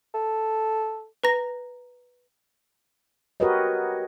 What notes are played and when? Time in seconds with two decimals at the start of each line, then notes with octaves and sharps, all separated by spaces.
0.14 A4
1.23 B4 A#5 A#6
3.40 F#4 G4 A#4 B4 C#5 D#5